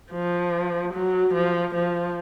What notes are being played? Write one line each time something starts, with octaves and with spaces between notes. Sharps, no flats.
F3
F#3
F3
F3